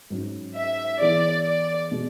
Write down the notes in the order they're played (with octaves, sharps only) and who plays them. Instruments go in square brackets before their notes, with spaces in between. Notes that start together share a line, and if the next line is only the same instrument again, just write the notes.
[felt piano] G#2 F#3 C#4
[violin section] E5
[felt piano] E3 B3 E4 G#4 [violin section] D5
[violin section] D5
[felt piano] B2 G#3